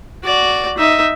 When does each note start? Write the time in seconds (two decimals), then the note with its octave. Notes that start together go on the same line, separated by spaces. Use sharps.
0.24 F#4 D5
0.78 D#4 E5